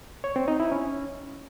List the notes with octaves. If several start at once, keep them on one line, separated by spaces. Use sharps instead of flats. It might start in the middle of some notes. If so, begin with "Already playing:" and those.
C#5
C4
D#4
E4
C#4